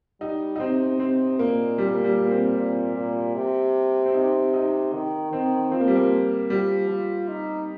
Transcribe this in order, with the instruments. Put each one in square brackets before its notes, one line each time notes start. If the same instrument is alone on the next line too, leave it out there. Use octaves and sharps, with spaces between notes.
[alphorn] G3 [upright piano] D#4
[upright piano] D#4
[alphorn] C3 [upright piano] C4
[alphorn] C3 [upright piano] C4
[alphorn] A#2 [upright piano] A#3
[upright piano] G3
A#3
G3
A#3
C4
[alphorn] A#2
A#2
C3
[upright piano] C4
D#4
D#4
[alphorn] D#3
[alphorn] D#3 [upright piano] C4
[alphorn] F3 [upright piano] C4
[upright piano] A#3
G3
A#3
[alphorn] F3 [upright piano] G3
[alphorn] F4
D#4